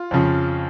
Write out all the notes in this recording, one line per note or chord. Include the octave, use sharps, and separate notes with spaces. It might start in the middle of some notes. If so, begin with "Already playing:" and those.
Already playing: F4
F2 C#3 F3